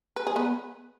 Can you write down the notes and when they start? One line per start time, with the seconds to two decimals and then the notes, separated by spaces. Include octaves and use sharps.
0.16 B4
0.27 G#4
0.36 B3 B4